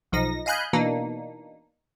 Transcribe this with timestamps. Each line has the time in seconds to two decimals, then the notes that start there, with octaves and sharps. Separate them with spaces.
0.12 B1 F3 D#4 A#6
0.46 D#5 F5 G#5 B5 F#6 G6
0.73 B2 E3 A#3 D4 D#4